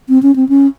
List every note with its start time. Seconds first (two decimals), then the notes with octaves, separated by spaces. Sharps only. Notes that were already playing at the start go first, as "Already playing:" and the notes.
0.09 C4
0.23 C#4
0.36 C4
0.49 C#4